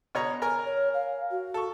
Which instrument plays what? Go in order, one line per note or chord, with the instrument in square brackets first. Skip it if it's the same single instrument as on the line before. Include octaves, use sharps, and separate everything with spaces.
[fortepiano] B2 C#5 A#5
A#4 G#5 A#5
[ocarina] C#5
F5
F#4
[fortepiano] A4 C#6